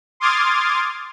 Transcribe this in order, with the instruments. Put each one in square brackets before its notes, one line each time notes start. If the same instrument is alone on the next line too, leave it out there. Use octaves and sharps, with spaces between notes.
[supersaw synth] C6 D6 D#6 F6 G#6 A6